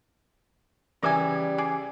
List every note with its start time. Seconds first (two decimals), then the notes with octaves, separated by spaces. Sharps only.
1.03 C#3 E3 G3 A#4 E5 G#5 D6
1.58 G#4 D5